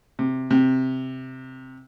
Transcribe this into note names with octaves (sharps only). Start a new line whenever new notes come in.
C3
C3